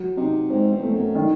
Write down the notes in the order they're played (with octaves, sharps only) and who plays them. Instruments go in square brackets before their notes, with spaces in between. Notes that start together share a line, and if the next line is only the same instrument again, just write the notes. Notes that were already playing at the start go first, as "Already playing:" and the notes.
Already playing: [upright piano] F#3
[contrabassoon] C3 [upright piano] D#4
[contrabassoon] G#2 [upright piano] C4
[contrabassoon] E2
[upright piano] A3
[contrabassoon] F#2
[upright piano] D#3